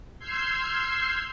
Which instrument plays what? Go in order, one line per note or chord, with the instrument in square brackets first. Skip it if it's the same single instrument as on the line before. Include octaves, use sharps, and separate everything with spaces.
[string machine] C6 E6 F6 G6 G#6 C7